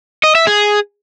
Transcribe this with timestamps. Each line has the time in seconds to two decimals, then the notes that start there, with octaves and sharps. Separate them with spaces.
0.24 D#5
0.35 E5
0.47 G#4